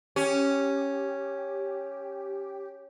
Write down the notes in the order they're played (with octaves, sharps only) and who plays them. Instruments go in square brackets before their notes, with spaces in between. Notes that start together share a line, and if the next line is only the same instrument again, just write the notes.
[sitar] C#4 [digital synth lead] G4